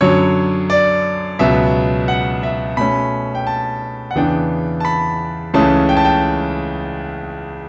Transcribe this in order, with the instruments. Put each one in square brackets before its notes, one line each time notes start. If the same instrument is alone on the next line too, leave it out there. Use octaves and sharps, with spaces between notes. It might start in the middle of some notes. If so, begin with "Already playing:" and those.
[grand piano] F#2 D3 F#3 C#5
D5
C#2 B2 F#3 B3 E5
F#5
E5
B2 A3 C#4 B5
G5
A5
F#5
E2 C#3 E3 B3 D4 G5
A5
B5
C#2 C#3 E3 A3 C#4 A5
G5
A5
G5